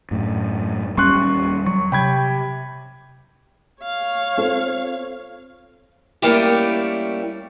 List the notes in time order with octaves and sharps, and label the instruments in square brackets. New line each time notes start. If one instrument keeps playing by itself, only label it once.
[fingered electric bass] F#2 A2
[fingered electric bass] D#2 G3 C#4 [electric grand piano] C6 C#6 F#6
[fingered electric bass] F#3 [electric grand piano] C#6
[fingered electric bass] C3 [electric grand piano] G5 B5 G#6
[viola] C#5 F5
[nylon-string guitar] C4 F4 A4
[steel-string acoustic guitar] G3 A3 A#3 C#4 E4 G4